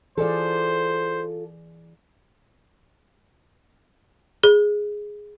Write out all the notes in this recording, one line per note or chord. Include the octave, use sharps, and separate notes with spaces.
E3 F4 G#4 A4 C5 D5
G#4